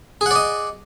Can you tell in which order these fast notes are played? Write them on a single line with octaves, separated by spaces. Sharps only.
G#4 F#5 D5 D#5